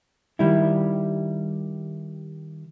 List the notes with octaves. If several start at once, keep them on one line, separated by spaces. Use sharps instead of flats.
D#3 G3 E4